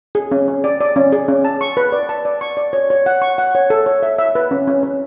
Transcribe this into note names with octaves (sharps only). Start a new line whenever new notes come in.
G#4
C#4
C#4
D5
D5
C#4
G#4
C#4
A5
C#6
B4
D5
A5
D5
C#6
D5
C#5
C#5
F#5
C#6
F#5
C#5
A4
C#5
E5
E5
B4
C#4
C#4
C#4